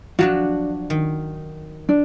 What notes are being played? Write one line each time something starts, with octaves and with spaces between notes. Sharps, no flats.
F3 F#3 D4 F#4
D#3
D4